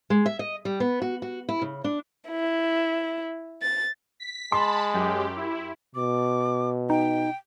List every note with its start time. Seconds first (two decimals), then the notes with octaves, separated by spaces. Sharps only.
0.10 G#3
0.26 E5
0.39 D#5
0.65 G3
0.80 B3
1.02 F#4
1.22 F#4
1.49 E4
1.62 C#3
1.84 D4
2.30 E4
3.62 A6
4.20 B6
4.52 G#3 A5 B5 C6
4.93 F#2 G4
5.36 E4
5.95 B2 D6
6.90 D#4 G5